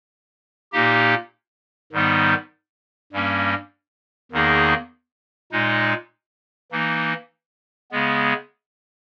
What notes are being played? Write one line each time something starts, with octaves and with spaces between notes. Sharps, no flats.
A#2 A#3 D#4 G4
G#2 D#3 G3 B3 D#4
G2 G3 A#3 C#4
E2 D#3 A#3 D#4 G#4
A#2 G#3 D#4
E3 A#3 D#4
C#3 G#3 B3